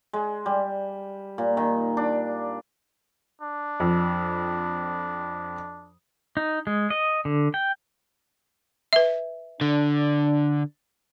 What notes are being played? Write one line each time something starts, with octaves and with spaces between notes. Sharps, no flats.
G#3
G3
A#2
D#3
D4
D4
F2
D#4
G#3
D#5
D3
G5
B4 E5
D3 D4